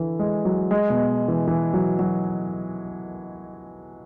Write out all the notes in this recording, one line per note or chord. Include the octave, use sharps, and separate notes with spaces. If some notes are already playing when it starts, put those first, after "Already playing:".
Already playing: D3 E3
G#3
F#3
G#3
B2
E3
E3
F#3
F#3